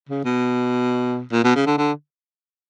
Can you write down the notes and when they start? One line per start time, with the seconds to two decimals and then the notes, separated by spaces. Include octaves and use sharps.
0.09 C#3
0.25 B2
1.32 A#2
1.44 B2
1.56 C#3
1.66 D3
1.78 D3